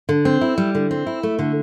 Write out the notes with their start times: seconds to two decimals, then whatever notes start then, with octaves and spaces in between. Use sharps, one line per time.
0.09 D3
0.25 C4
0.41 E4
0.58 G3
0.75 D3
0.91 C4
1.07 E4
1.23 A3
1.39 D3